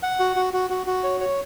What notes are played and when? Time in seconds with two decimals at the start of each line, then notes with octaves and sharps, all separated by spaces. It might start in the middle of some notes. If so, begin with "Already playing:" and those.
0.03 F#5
0.20 F#4
0.36 F#4
0.54 F#4
0.70 F#4
0.87 F#4
1.04 C#5
1.20 C#5